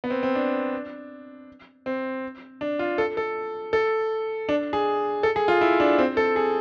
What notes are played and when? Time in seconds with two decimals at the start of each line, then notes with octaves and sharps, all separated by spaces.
0.04 B3
0.10 C4
0.23 C4
0.35 D4
1.86 C4
2.61 D4
2.79 F4
2.98 A4
3.17 A4
3.73 A4
4.49 D4
4.73 G#4
5.23 A4
5.36 G#4
5.48 F4
5.61 E4
5.80 D4
5.99 C4
6.17 A4
6.36 G#4